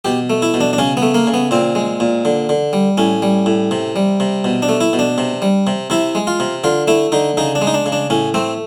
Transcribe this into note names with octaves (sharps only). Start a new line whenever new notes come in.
B2 G4
A3
E4
B2
D4
D4
C#3 C#4
B3
A3
A#3
C#3
B3
A#2 C4
G#3
A#2
D3
D3
G3
A2 C#4
G3
A2
C3
G3
C3
B2
D4
A3
E4
B2
D4
C3
G3
C3
C3 E4
G#3
F4
C3
D3 F4
A3 E4
D3 D#4
C#3 D#4
D4
G#3
D#4
D4
C#3
D4
A2 C#4
A3 C4